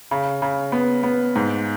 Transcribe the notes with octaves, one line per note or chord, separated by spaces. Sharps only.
C#3
C#3
B3
B3
G#2